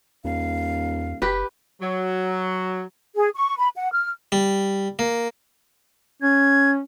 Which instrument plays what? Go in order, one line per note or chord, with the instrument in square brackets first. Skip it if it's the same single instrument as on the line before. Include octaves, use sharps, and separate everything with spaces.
[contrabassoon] D#1 [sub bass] E2 [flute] F5
[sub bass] F#1 [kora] G4 B4
[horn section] F#3
[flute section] G#4
C#6
B5
F#5
F6
[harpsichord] G3
A#3
[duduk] C#4 [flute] G#6